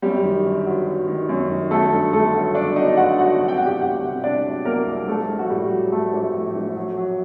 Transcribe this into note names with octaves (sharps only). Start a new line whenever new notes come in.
F#2 G3 G4
D#3
G1
F#3
F#3
D#3
F#2
D#3
F#3 A3 A4
G2
G1 A3 A4
F#3
G1 D4 D5
F#3 D#4 D#5
G1 F#4 F#5
F#3 F#4 F#5
C3
G5
C2 F#5
G4 G5
C2 F#4 F#5
C3
C2 D4 D5
F#3
C2 A#3 A#4
C2
A#1 A3 A4
A#1
F#4
A2 G3 G4
F#3
F#3 A3 A4
A#1
A2
A#1
F#3
F#3